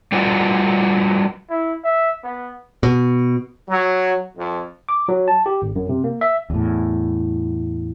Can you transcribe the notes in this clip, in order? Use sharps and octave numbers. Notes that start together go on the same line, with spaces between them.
G3 F4 F#4 B4 D#5
E4
E5
B3
B2
F#3
F2
D6
F#3
A5
G4
G#1
F#2
C3
A#3
E5
E2 A2